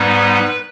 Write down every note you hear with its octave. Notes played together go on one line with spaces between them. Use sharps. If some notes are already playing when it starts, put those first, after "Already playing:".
Already playing: G#2 G3 B3 D#4 B4